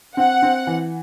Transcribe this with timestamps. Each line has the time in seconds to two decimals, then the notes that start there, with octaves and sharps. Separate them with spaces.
0.17 C4 F#5
0.43 C4
0.67 E3